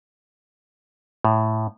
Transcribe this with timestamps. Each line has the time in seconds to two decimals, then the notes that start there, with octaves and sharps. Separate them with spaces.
1.25 A2